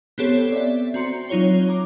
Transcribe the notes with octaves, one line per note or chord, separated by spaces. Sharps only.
B3 C4 G4 A4 C#5
D5 E5
C4 F#4 A#5 C6 C#7
F#3 D#4 F4 C#5 G7
A#5 D6